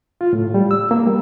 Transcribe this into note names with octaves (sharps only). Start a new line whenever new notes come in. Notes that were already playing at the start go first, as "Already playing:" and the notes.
F4
A2
G3
E6
A#3
G3